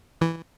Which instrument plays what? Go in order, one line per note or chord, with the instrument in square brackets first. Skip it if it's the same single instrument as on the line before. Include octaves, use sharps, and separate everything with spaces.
[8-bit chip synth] E3